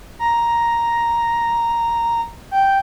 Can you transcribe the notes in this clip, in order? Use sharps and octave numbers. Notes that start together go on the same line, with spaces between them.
A#5
G5